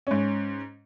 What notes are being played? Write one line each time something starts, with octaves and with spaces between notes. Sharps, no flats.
G#2 C#4